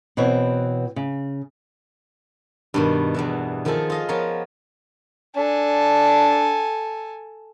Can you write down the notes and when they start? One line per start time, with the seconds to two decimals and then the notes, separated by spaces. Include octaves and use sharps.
0.17 B2 E3 C4 B4 C#5
0.96 C#3
2.74 G2 B2 D#3
3.14 E2 G2 E3
3.65 D#3 F3 F4 G#4 A4
3.90 F4 D#5 F5
4.08 F3 B3 A#4 C#5 F5 C6
5.36 D4 A4 G#5